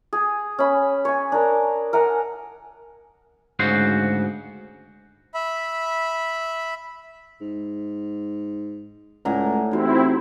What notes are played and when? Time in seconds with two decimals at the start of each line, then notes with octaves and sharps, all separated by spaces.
0.13 G#4
0.59 C#4 B5
1.05 C#5 G#5
1.32 D4 A#4
1.93 A#4 F#5 G#5 A#5
3.59 D2 G#2 C#3 F#4 C5 C6
5.34 E5 B5
7.41 G#2
9.25 C#2 A2 D5 F#5 G#5 A#5
9.72 E2 C4 D#4 E4 F#4 G4